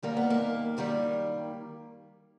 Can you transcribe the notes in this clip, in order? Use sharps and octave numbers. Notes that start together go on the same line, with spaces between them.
D#2 D#3 G3 A#3
B3
A#3
F#2 D#3 G3 A#3